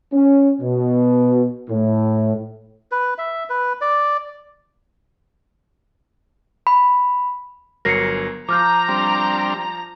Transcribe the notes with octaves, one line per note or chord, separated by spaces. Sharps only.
C#4
B2
A2
B4
E5
B4
D5
B5
G1 F#3 A#4 A#6 C7 C#7
F3 F4 A#5 D6 F6 G6
G3 C4 D4